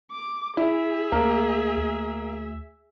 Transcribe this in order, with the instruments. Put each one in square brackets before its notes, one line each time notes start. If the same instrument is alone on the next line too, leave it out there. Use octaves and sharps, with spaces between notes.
[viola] D6
[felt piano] E4 [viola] G#4 E5
[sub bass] D2 [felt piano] A#3
[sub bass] D2